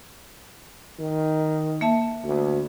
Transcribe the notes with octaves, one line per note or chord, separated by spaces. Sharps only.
D#3
A#3 E5 A5
D2